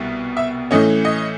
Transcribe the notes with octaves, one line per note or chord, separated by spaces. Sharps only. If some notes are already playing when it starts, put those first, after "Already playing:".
Already playing: C2 B2 G3 B3
E5
A2 E3 A3 C#4 D#5
D#5